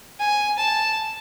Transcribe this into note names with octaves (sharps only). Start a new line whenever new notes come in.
G#5
A5